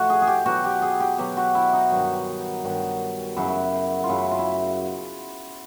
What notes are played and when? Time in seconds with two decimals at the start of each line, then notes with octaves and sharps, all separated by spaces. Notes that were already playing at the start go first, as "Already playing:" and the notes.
Already playing: A2 F3 F#4
0.10 G#4
0.22 G#4
0.27 G4
0.46 B2 F#3 F#4
0.64 G4
0.82 G#4
1.00 G4
1.19 B2 F#3 G4
1.37 F#4
1.55 E4
1.73 D#4
1.91 G2 D#3 F#3
2.64 G2 D#3 F#3
3.37 F#2 C#3 F#3 E4
4.04 F4
4.09 F#2 C#3 F#3 E4
4.31 F4
4.39 E4